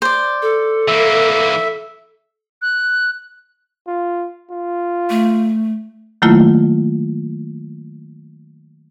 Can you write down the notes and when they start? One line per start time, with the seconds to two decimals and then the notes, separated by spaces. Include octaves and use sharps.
0.02 C5 D5
0.42 A4
0.88 E3 A#3 E5
2.62 F#6
3.87 F4
4.51 F4
5.10 A3
6.22 D#3 F#3 A3 A#3 E4 F4